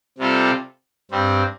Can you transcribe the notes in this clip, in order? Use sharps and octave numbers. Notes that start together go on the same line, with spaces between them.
C3 G3 F4 A4
G2 G3 C4